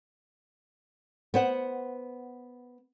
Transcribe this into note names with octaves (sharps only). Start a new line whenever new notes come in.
B3 C5 F#5